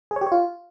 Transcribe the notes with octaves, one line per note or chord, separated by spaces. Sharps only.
G#4
C#5
G4
C#5
F4